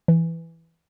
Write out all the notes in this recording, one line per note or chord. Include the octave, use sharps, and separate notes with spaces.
E3